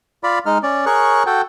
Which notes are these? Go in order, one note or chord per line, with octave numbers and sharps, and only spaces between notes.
F4 D5 B5
G#3 D#4 F6
C#4 D5
G#4 A#4 C#5 C#6 F#6
F#4 A4 G5